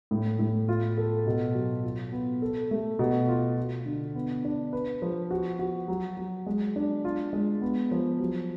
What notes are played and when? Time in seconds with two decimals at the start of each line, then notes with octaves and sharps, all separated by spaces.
0.11 A2
0.39 A2
0.68 F4
0.98 A4
1.27 B2
1.55 F#3
1.84 F4
2.12 B3
2.42 A4
2.71 A3
2.99 B2
3.29 F4
3.57 F4
3.86 D3
4.15 B3
4.45 D4
4.73 B4
5.02 F3
5.31 F#4
5.59 F#4
5.88 F#3
6.17 F#3
6.47 G#3
6.76 D4
7.05 F4
7.33 G#3
7.61 B3
7.91 F3
8.20 F#3